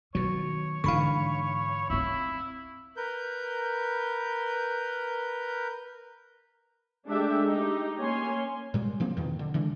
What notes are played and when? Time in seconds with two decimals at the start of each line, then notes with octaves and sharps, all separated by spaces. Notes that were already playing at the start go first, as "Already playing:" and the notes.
0.15 B2 D#3 F#3 C#5
0.84 G#2 D3 E3 D4 F5 B5 C#6
1.90 C4 D#4 E4
2.97 A#4 B4 G6
7.08 G#3 A3 D4 G4 E5
7.46 D#4 G4
8.00 A#3 C#4 C#5 G#5 C6
8.74 A#2 G3 G#3
9.00 C3 F3 A#3 C4
9.17 E2 B2 D#3
9.39 D3
9.54 D3 E3 G#3 D4